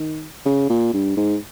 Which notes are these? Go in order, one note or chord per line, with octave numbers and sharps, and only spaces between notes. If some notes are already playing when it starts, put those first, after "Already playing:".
Already playing: D#3
C#3
A#2
G2
G#2